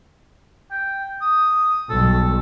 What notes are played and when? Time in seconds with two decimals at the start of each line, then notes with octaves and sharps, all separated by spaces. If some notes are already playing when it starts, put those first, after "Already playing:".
0.71 G5
1.22 D#6
1.90 B1 G2 A4